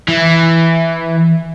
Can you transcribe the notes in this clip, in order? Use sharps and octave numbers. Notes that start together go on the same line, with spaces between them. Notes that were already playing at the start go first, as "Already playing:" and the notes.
E3